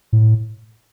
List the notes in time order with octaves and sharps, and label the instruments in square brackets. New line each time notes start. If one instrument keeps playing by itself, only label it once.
[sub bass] A2